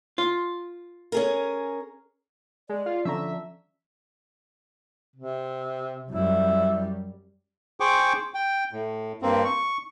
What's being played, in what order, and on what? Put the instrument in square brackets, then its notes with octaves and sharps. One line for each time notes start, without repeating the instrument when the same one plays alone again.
[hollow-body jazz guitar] F4
[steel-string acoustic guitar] C#4 G#4 A#4
[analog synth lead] G#3 [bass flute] D5
[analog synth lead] F4
[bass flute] D3 [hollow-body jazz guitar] F3 C#4 A#5 [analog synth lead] E5
[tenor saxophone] C3
[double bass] F#2 G3 [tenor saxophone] E4
[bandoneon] G#4 C5 G5 C#6 D6
G5
A2
G2 A#3 C4
C#6